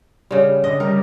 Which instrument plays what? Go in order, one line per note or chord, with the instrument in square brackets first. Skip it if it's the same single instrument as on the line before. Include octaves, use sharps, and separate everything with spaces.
[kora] C#3 G3
[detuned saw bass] D3 [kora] D#5
[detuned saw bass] G3 [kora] A#4